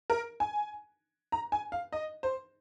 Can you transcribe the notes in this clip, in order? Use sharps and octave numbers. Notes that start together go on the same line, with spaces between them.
A#4
G#5
A#5
G#5
F5
D#5
C5